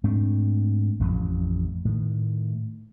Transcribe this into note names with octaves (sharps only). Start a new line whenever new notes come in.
G#2 A3 C4 D4
E1 A1 F2
A2 D#3